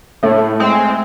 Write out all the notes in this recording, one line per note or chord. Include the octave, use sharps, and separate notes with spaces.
A2 A3
G#3 C4